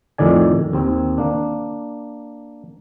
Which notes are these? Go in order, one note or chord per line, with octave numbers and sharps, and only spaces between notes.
F2 A2 D#3 D5 G#5
D#2 C4
A#3 D4